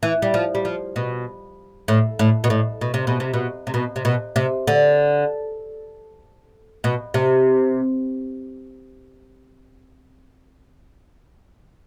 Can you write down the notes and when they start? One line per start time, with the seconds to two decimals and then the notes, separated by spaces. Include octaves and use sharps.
0.03 E3
0.22 G3
0.34 F3
0.55 G3
0.65 F3
0.96 B2
1.88 A2
2.19 A2
2.44 B2
2.50 A2
2.81 B2
2.94 C3
3.07 B2
3.20 C3
3.34 B2
3.67 C3
3.74 B2
3.96 C3
4.05 B2
4.36 C3
4.67 D3
6.84 B2
7.14 C3